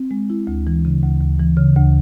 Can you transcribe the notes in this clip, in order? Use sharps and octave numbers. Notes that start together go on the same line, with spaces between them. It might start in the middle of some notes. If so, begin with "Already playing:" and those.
Already playing: C4
G#3
E4
D2
E3
C#3
D2
D2
E3
C#3
D2